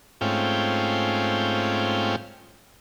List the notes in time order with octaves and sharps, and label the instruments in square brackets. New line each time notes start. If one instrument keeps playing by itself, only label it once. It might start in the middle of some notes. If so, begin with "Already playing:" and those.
[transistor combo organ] G#2 A3 C4 C#4 F4 G5